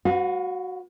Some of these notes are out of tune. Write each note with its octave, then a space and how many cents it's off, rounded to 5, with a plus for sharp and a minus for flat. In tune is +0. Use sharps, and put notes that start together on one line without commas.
F#4 +0 B4 +20 F5 +40